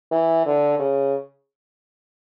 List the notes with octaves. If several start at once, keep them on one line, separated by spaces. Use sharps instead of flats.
E3
D3
C#3